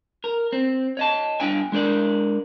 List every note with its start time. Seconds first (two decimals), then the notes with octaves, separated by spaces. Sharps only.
0.24 A#4
0.53 C4
0.97 C#5 D#5 A5
1.40 G2 D4 G5 G#5
1.72 G#3 D4 A#4 D5